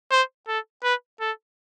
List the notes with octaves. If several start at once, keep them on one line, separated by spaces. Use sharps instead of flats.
C5
A4
B4
A4